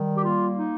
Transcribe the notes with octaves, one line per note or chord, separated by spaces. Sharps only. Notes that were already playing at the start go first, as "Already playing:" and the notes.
Already playing: D#3 G3
G4
A#3 F4
D#4